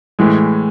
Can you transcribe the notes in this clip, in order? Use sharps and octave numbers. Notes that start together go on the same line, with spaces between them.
A2 E3 G#3